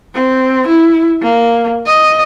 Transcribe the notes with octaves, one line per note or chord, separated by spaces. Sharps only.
C4
E4
A#3
D#5